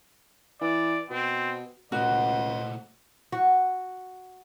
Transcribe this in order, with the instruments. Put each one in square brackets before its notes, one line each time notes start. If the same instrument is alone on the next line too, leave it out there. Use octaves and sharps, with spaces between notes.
[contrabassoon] E3 [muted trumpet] D5
[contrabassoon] B2 [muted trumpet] C4
[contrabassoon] C#2 [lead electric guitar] A#2 A3 [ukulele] F#4 [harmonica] C5 D#5 F#5
[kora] F#4